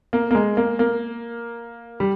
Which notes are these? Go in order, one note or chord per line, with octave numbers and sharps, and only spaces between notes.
A#3
A#3
G#3
A#3
A#3
G3